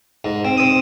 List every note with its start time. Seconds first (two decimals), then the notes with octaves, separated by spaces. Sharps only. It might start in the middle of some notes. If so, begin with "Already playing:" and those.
0.25 G#2
0.45 C4
0.57 C4 D#6